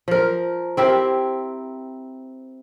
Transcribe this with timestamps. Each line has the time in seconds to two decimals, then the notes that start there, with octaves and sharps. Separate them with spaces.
0.08 F3 A#4
0.77 C4 E4 G4 A#4